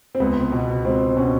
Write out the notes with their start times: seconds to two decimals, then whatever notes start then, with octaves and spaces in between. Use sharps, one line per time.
0.15 C4
0.20 C#2 B3
0.52 B2
0.85 C#2 C4
1.16 B2 C#4